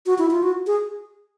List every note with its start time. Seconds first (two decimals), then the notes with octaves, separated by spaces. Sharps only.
0.06 F#4
0.18 E4
0.31 F4
0.43 F#4
0.67 G#4